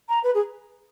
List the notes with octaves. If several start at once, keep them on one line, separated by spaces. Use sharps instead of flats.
A#5
B4
G#4